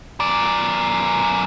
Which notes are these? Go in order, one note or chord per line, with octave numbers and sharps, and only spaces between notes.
F#2 D5